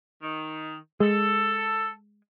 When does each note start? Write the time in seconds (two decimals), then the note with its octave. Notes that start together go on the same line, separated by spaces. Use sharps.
0.22 D#3
1.00 G#3 A4